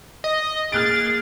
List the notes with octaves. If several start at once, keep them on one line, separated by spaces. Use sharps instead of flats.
D#5
A#3 G#4 F6 F#6 A6 D7